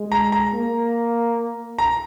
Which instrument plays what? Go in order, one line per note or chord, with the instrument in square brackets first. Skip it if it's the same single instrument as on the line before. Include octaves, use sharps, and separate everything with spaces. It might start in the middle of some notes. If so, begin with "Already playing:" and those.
Already playing: [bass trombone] G#3
[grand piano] A#5
A#5
[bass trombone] A#3
[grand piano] A#5